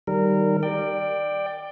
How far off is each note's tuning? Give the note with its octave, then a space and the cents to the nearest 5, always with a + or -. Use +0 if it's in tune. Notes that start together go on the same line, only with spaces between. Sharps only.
D#3 +0 G3 -15 A#4 -20
D5 +15 G5 +0